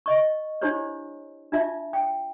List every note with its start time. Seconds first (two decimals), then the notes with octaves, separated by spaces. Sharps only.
0.06 D#5 C#6
0.61 D4 E4 G4 C5 C#5
1.52 D4 F4 E5 A5
1.93 G5